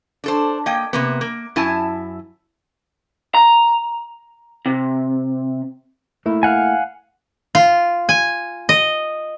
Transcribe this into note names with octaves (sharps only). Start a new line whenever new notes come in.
D4 A4 C5
A#3 D#5 G5
C3 A#3 B3
A#3
F#2 E4 G#5 A5
A#5
C3
A3 A#3 E4
F5 F#5 G#5
F4
G#5
D#5